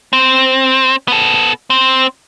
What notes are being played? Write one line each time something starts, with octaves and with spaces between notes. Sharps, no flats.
C4
B3 A4
C4